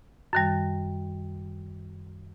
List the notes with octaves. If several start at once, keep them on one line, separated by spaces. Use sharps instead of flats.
F#2 D#3 G3